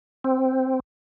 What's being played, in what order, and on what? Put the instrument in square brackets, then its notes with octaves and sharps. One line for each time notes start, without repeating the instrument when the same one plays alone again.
[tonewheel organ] C4